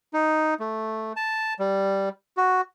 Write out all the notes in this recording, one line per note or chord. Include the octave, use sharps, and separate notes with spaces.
D#4
A3
A5
G3
F#4